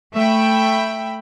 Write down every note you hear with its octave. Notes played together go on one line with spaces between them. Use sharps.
A3 E5 G5 B5